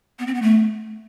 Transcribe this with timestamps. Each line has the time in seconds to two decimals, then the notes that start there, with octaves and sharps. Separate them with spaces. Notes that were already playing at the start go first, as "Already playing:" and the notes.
0.19 B3
0.27 C4
0.34 B3
0.42 A3